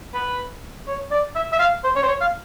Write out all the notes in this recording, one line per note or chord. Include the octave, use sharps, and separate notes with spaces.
B4
C#5
D5
E5
E5
F5
C5
C#5
C5
C#5
F5